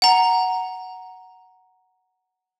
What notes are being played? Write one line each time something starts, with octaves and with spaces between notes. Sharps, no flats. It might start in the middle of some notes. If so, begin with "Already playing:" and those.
F#5 A#5